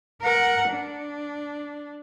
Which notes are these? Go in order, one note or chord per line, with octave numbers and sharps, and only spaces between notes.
A#4 F#5
D4